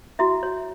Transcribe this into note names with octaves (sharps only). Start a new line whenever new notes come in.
E4 F#4 E5
C#5